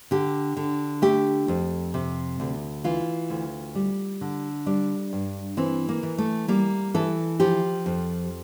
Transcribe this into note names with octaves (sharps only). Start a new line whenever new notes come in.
D3 G4
D3
A3 G4
F2
C3
D2
E3 F4
D2
G3
D3
G3 D4
G2
E3 C4
A#3
E3
A3
G3 A#3
E3 A4
F3 G4
F2